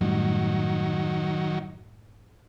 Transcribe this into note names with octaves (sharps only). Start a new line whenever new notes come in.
F#2 A2 D#3 F#3 G3